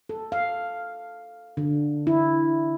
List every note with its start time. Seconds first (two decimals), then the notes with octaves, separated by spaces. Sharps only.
0.09 A4
0.32 F5
1.57 D3
2.07 E4